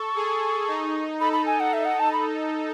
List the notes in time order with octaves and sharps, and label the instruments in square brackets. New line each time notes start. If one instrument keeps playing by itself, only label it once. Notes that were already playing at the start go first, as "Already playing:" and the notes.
Already playing: [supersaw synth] A4 [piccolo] C#6
[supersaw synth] G#4
D#4
[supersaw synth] A4 [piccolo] B5
[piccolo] B5
G#5
F#5
E5
F#5
A5
B5